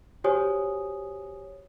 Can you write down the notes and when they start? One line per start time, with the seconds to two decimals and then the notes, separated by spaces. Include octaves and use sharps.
0.24 F#4 G4 C5 C#5 G#5 D#6